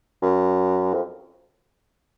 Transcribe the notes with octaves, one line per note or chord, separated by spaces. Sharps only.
F#2
F2